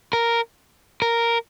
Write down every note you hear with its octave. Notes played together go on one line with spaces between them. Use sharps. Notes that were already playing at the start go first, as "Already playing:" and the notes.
A#4
A#4